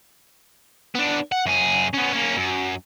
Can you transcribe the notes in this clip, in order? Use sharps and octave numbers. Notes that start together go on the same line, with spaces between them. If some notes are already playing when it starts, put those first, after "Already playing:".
B3 D4
F#5
F#2 G#4
B3 C#4
A#3 C#4
F#2